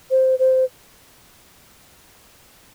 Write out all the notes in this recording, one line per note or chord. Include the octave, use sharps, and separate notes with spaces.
C5
C5